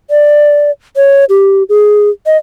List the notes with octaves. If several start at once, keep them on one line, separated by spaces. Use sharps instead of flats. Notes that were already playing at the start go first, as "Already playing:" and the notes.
D5
C#5
G4
G#4
D#5